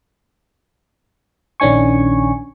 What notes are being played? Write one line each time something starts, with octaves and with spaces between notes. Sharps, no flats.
A#1 D#3 C#4 D4 G#5 C#6